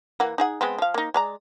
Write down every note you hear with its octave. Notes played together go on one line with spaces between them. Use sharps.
E3 A#3 F#5
D#4 G#4 F#5
G#3 B3 C4
F3 F5
A#3 D#4
G#3 D5 A#5